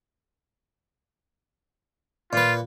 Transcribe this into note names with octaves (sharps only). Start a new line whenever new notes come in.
A#2 F4 B4